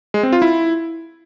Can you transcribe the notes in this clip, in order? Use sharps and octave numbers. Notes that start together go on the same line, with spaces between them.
G#3
C4
F4
E4